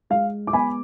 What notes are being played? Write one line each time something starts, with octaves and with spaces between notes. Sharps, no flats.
G#3 F5
D6
B3 G#5 B5